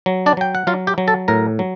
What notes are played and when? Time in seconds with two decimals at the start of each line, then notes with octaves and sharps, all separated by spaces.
0.06 F#3
0.26 D4 D5
0.37 F#3 G5
0.55 F#5
0.67 F#3 F4 F5
0.87 G4 G5
0.98 F#3
1.08 A4 A5
1.28 A2 A#4 A#5
1.59 F#3